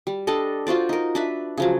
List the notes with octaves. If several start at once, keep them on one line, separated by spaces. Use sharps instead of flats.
G3
G3 D4 A4 D#5
F4 F#4 C5 D5
D#4 A#4
D4 B4 E5
C#3 F3 F#3